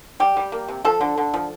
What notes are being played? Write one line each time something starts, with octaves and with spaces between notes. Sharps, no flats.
G3 G4
G3
A#3
C3
F3 A4
D3
D3
F3